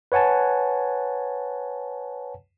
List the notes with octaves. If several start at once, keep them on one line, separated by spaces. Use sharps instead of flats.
B4 C#5 F#5 G#5 A5